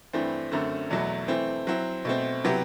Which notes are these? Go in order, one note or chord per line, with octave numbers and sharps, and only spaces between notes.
G2 E3 A3 C4
F#2 D3 A3 C4
E2 B2 F#3 A3
E3 A3 C4
F#3 C4 E4
B2 A3 C4
C3 F#3 B3 E4 G4